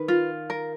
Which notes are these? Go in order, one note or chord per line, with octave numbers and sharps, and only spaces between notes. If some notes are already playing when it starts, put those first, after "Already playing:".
Already playing: D#3 B4
F4
A#4